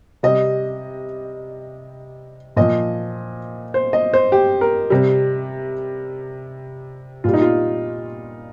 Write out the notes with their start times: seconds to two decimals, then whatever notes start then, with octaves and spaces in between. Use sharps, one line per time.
0.23 C3 G3 D#5
2.56 A#2 F3 D#5
3.74 C5
3.93 D#5
4.14 C5
4.32 G4
4.61 A#4
4.90 C3 G3
7.24 A#2 G3 F4
7.34 D#4
7.42 F4